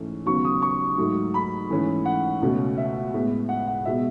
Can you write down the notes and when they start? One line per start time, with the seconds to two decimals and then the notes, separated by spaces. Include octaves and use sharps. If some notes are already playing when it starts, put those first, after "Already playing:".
Already playing: G#2 E3 A3 C#4
0.26 D#2 C#3 F#3 B3 C#6
0.45 D#6
0.62 C#6
0.98 G#2 F#3 A3
1.34 B5
1.70 G#2 E3 A3 C#4
2.05 F#5
2.42 C#2 B2 A3 C#4
2.78 E5
3.14 A2 G#3 B3
3.49 F#5
3.67 F#5
3.85 B2 G#3 B3 E5